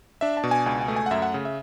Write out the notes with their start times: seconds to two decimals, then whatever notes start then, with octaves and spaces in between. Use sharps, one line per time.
0.21 D4 E5
0.37 A5
0.43 B2
0.51 G#5
0.66 C#2 G#5
0.81 G#5
0.88 A3
0.96 G#5
1.06 F#5
1.11 F#2 E5
1.22 F#5
1.34 C#3
1.45 E5